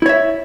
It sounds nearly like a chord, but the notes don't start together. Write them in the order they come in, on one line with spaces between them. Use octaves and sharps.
E4 C#5 E5